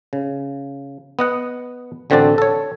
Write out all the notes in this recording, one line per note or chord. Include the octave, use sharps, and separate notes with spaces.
C#3
B3 D#5 F#5
A1 D3 C4 F#4 D5 A5
A4 C#5